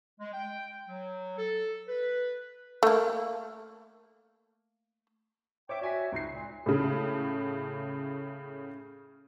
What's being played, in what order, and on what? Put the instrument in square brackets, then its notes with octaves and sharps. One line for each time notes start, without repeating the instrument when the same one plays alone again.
[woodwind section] G#3
G5
F#3
A4
B4
[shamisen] A3 A#3
[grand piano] C#5 E5 [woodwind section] G5 D6
[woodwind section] F#4 C#5 E5 [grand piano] D5 G#5 B6
[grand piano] C#2 C7 [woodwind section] D#4 F#4
[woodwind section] A#2
[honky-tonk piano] A2 C#3